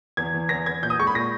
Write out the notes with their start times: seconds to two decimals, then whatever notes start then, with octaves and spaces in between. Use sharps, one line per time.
0.17 E2 G#6
0.34 E2
0.49 E2 A#6
0.66 E2 G#6
0.82 A#2 G6
0.90 D#6
0.99 G#3 C#6
1.07 B5
1.15 A#2 A#6